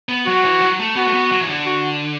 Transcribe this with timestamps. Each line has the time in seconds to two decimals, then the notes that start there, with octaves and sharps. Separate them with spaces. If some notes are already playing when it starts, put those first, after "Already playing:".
0.09 B3
0.26 F#3 F#4
0.45 E3
0.62 F#3
0.79 A3
0.96 B3 F#4
1.07 A3
1.13 B3
1.32 F#3
1.41 E3
1.49 D3
1.66 F#4